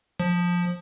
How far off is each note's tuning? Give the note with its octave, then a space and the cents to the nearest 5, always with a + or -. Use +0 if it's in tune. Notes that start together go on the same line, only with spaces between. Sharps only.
F3 +15